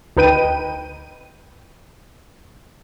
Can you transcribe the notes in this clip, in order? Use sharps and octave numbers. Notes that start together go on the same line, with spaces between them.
D2 D#4 B4 G5 D#7